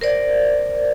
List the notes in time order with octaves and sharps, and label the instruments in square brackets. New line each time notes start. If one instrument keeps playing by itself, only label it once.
[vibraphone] A#4 C5 D5